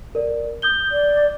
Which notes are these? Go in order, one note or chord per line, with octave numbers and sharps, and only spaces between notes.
A#4 D5
D#6 G6 G7
D5